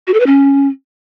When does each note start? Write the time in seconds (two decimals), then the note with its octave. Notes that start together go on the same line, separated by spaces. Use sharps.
0.07 F#4
0.14 A4
0.20 B4
0.26 C#4